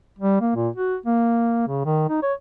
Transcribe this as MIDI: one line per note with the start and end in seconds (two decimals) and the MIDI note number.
0.19 0.41 55
0.41 0.52 58
0.56 0.69 46
0.76 0.96 66
1.06 1.64 58
1.68 1.84 49
1.85 2.04 51
2.09 2.22 63
2.22 2.33 73